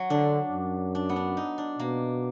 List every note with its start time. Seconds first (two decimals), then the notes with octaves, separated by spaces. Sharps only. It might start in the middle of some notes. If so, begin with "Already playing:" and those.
Already playing: F#3
0.10 D3 D4
0.52 F#2
0.95 D4
1.09 B3
1.16 D4
1.37 D#4
1.58 D4
1.79 B2 A#3